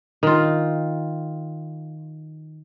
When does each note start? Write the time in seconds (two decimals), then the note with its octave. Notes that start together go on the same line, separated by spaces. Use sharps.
0.23 D#3 F4